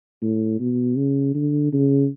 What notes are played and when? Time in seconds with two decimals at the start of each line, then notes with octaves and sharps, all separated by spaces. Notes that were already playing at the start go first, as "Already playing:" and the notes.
0.22 A2
0.60 B2
0.97 C#3
1.34 D3
1.72 C#3